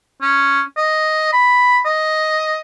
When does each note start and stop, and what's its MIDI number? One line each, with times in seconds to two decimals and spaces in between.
0.21 0.62 61
0.77 1.30 75
1.33 1.80 83
1.85 2.60 75